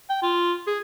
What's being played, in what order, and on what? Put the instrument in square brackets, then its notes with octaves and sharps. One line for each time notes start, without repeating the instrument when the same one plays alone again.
[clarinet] G5
F4
G#4